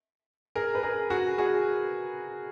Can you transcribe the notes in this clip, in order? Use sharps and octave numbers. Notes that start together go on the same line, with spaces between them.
G#4 A#4
B4
G#4 A#4
F#4 G#4
F#4 G#4